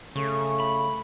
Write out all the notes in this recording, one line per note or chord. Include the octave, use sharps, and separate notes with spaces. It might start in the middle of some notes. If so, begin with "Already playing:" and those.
C#3 A3 C#6
B5